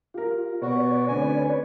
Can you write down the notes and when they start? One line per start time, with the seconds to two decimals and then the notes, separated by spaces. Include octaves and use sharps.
0.14 F4 G4 A#4
0.62 B2 F#4 B4 C#5 D5
1.08 D2 C4 C#4 G#5